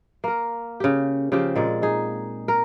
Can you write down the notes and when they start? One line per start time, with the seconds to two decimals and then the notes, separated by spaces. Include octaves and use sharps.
0.24 A#3 A#4
0.80 C#3 G4
1.32 C#3 F3 C4 G4
1.56 A#2 G#3 D5
1.82 D#4 G#4
2.48 A#4